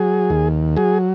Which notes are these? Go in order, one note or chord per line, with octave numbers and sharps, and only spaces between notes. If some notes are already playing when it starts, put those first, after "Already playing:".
Already playing: F#3 G#4
D#2
F#3 G#4